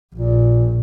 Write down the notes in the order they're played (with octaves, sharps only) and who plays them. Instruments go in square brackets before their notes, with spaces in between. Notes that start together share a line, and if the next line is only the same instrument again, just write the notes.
[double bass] A#1 [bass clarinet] A#2